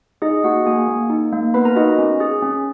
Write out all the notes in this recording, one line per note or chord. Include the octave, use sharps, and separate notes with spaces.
D#4 G#4 D#5
A#3 F#4 F#5
A#3 G#4 G#5
A#3
D#4
A#3
B3 B4 B5
A#4 A#5
D#4 F#4 D#5
C#4
G#4
C#4